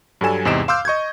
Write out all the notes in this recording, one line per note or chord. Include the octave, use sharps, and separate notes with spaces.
G2 F#3 G3 A4 G#5 E7
E2 G#2 C3 D#5 D7 E7
F5 C6 D6 E6 F6 G6
D#5 C#6 G6 G#6